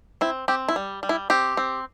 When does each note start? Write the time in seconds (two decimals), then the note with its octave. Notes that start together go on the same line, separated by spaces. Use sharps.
0.21 C4 E4
0.48 C4 G4
0.68 E4
0.76 G3
1.03 G3
1.09 E4
1.30 C4 G4
1.57 C4